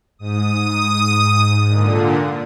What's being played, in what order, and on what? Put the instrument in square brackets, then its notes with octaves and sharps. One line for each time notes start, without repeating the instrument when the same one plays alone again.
[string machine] G#2 [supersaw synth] D#6
[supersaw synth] A#2 D3